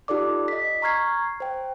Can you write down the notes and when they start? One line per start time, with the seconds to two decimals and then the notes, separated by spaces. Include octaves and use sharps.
0.08 D#4 F4 G4 A4 D5 D6
0.48 D#5 B6
0.82 A#5 C#6 F6 G#6 C7
1.40 C5 G5